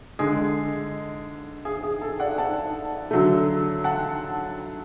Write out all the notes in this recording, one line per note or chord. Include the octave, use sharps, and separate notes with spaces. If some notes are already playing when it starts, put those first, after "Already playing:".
D3 G#3 G#4
G#4
G#4
A4
D5 F#5
F#5 A5
D3 F#3 A3
F#5 A5